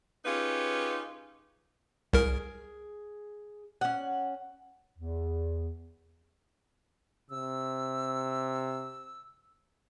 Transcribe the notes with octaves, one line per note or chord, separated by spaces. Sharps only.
C#4 D#4 F4 G4 G#4 B4
C2 G#4 A#4
C#4 F#5
E2
C3 E6